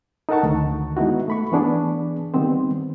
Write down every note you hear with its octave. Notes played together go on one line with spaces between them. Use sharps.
D#4 A4 A#4 F#5 A5 C#6
D2 D#3
G#3 B3 D#4 E4 F#4
A3 B5 C#6
E3 B3 D4 G#4
D#3 G3 B3 C4 C5